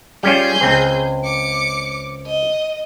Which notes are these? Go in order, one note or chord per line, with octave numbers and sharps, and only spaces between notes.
G3 C#4 F4 G#4 G6
C#2 C4
D6 C#7
D#5